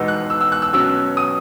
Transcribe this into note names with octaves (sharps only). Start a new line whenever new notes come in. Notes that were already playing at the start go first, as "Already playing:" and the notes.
Already playing: E2 B2 G#3 B3 D#4 E6
F#6
E6
E6
F#6
E6
B2 F#3 C#4 E6
D#6